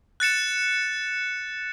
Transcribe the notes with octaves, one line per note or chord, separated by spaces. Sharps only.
F#6 A6 C#7 E7